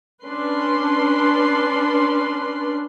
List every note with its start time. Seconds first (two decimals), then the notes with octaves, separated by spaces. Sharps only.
0.23 C#4 D4 B4 C6